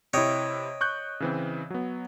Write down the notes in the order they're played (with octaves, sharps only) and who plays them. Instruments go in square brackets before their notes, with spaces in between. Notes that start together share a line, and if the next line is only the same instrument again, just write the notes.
[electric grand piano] C3 E4 [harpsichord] C#5 D#5 G5
[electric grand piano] C#6 F#6 G6
C#3 E3 C4
F#3 B3